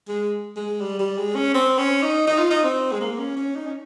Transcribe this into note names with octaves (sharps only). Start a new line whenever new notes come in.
G#3
G#3
G3
G3
G#3
C#4
C4
C#4
D#4
D#4
F4
D#4
C4
G#3
A#3
C#4
C#4
D#4
C#4